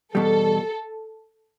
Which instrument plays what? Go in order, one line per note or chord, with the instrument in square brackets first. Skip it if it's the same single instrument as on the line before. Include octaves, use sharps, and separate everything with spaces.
[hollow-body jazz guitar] E2 B2 G3 [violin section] A4